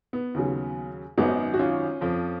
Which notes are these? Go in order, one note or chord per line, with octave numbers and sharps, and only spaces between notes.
B3
D#2 C#3 F#3
G#1 F#2 D#3 F#3 B3 D#4
F#4
C#4 F4
F2 F3